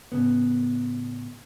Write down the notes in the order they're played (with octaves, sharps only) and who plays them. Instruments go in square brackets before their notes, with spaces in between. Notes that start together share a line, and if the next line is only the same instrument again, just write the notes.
[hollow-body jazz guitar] A2 C#3 B3